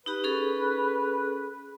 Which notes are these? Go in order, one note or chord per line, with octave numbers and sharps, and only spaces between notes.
D#4 G4 B4
C#4 G#4 A4